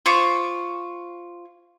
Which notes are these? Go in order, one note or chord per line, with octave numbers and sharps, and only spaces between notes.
F4 C5 C#6 D6